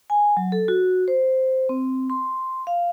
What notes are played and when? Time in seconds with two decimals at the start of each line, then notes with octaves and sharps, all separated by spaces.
0.10 G#5
0.37 F#3
0.52 A4
0.68 F#4
1.08 C5
1.69 C4
2.10 C6
2.67 F5